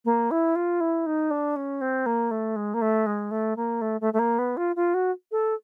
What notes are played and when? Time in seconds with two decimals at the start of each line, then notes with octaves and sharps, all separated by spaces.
0.05 A#3
0.31 E4
0.55 F4
0.80 E4
1.06 D#4
1.31 D4
1.56 C#4
1.81 C4
2.06 A#3
2.31 A3
2.56 G#3
2.74 A#3
2.81 A3
3.06 G#3
3.31 A3
3.56 A#3
3.81 A3
4.01 A3
4.13 A3
4.19 A#3
4.39 B3
4.57 F4
4.76 F4
4.94 F#4
5.32 A4